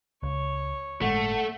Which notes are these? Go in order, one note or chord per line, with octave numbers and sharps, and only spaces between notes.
C#2 C#5
G1 A2 G#3 A3 F#5